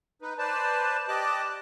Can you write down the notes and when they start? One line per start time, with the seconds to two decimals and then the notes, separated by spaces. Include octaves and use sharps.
0.22 D#4 B4
0.38 B4 C5 D5 A5
1.08 G4 D5 D#5 A5 D6 F#6